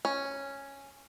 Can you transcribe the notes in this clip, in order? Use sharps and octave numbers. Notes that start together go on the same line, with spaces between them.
C#4